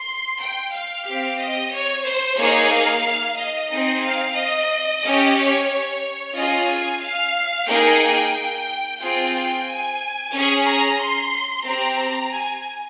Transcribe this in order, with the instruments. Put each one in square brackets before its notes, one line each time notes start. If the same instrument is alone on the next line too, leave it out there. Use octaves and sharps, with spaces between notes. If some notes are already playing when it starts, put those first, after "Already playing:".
Already playing: [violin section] C6
G5
F5
C4 G4
D#5
C#5
C5
A#3 D#4 G#4 C#5
F5
D#5
C4 D#4 G#4
F5
D#5
C#4 G4
C#5
C#5
C#4 F4 G#4 D#5
G#5
F5
A#3 D#4 G#4 G5
C4 F4 G#4 G5
G#5
C#4 G#4
A#5
C6
C4 G4 A#5
G#5